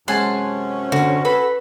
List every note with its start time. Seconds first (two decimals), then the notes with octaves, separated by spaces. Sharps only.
0.08 F#2 C3 G#3 C#4 F#5 G#5 A5 C6
0.92 D3 F#4
1.25 C#4 A4 B4 B5